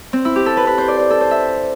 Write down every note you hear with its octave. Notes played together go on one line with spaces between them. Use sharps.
C4
E4
G4
A4
B4
B4
C5
D5
C5
A4
C5
E5